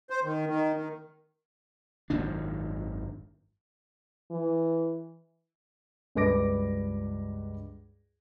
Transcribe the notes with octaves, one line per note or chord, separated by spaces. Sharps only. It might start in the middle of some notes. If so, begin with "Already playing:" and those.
C5
D#3
D#3
D#3
G#1 F#2 D#3 D4
E3
C#2 G2 B4 D6 A#6 D7